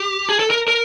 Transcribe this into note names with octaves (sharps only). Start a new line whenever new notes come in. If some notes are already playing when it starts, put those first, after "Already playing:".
Already playing: G4
G#4
A4
A#4
A#4